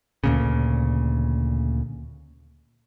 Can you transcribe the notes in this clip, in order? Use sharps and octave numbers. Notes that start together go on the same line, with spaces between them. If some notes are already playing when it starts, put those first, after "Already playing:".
D2 A#2 C#3